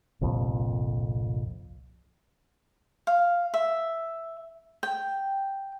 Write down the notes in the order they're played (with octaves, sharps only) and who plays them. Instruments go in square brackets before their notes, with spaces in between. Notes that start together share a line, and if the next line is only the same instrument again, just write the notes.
[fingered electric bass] G1 C2 F2 A#2
[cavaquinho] F5
E5
G5